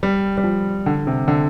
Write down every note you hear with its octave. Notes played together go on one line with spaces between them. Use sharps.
G3
G3
F3
D3
C3
D3